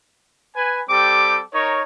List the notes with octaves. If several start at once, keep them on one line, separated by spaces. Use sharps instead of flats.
B4 G#5
G3 C4 G4 A4 D6
D#4 A#4 C#5